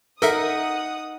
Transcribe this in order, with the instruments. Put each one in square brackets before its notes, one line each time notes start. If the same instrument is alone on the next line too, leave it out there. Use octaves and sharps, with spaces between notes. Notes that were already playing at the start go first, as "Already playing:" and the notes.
[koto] D#4 [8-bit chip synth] A4 A#4 E5 [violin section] F#5 D#6